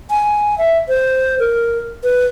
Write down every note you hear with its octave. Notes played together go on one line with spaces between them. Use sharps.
G#5
E5
C5
A#4
B4